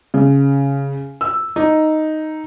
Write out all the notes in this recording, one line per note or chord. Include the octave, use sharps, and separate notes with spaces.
C#3
E6
D#4